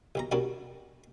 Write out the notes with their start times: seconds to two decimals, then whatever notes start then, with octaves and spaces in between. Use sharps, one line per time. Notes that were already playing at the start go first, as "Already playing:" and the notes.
0.15 B1 B2 A#5
0.32 B2 G3 C#4 D4 F#4 A#4